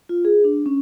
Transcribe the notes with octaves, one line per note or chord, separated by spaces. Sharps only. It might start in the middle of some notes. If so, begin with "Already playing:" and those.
F4
G#4
D4
C#4